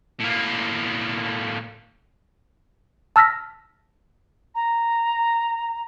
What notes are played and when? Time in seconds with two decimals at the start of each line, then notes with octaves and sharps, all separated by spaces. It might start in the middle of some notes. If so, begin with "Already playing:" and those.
0.20 A2 A#3
3.16 A5 E6 F6 A#6 B6
4.55 A#5